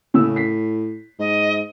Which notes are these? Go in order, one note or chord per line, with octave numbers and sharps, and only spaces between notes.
A2 C#3 E6
B6 C7
G#2 D#5